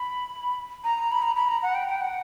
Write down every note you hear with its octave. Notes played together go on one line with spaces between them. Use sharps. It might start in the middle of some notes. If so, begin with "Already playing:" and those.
Already playing: B5
A#5
B5
A#5
B5
A#5
F#5
G5
G5
F#5